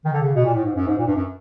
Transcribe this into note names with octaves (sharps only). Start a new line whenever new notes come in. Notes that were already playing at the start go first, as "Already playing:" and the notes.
D#3
D3
C#3
B2
A#2
A2
G#2
F#2
G#2
A#2
G2
F#2